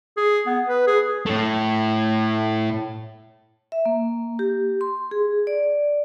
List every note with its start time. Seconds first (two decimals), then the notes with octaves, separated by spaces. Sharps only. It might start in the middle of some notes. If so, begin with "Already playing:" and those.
0.17 G#4
0.46 B3
0.68 B4
0.87 G#4
1.26 A2 A3
3.72 E5
3.86 A#3
4.39 G4
4.81 C6
5.11 G#4
5.47 D5